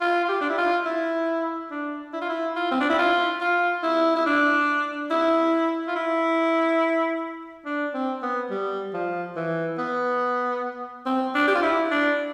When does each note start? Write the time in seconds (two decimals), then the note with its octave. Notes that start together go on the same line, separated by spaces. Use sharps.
0.01 F4
0.25 F4
0.28 G4
0.41 D4
0.49 E4
0.58 F4
0.86 E4
1.71 D4
2.13 E4
2.21 F4
2.29 E4
2.56 F4
2.71 C4
2.80 D4
2.90 E4
2.98 F4
3.41 F4
3.83 E4
4.16 E4
4.26 D4
5.11 E4
5.88 F4
5.96 E4
7.65 D4
7.94 C4
8.23 B3
8.50 G3
8.93 F3
9.36 E3
9.78 B3
11.06 C4
11.35 D4
11.48 G4
11.55 F4
11.62 E4
11.91 D4